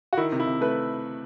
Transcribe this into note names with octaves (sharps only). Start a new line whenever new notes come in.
F#4
D#3 E4
C3
E4
C3
A3 B4